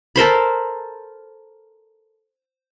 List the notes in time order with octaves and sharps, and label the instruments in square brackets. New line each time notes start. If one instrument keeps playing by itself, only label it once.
[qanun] A4 A#4 C5 B5